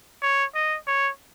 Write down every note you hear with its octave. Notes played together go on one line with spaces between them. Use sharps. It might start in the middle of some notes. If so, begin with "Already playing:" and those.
C#5
D#5
C#5